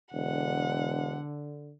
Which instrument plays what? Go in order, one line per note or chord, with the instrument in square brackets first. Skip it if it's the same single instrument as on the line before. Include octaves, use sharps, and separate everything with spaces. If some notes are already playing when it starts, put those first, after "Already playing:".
[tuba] E1 [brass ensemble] D3 [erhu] F#5